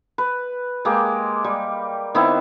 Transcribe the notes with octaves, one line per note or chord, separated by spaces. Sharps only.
B4
G#3 A#3 G4
G3
D#3 B3 C4 E4